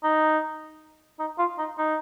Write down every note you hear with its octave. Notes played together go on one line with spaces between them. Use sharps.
D#4
D#4
F4
D#4
D#4